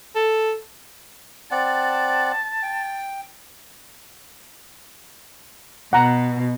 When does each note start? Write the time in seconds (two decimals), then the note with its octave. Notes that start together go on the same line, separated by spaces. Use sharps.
0.15 A4
1.51 C4 D5 F#5 A5
2.62 G5
5.93 B2 F#5 A#5